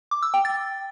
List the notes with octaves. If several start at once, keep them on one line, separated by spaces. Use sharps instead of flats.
D6
E6
G5
A6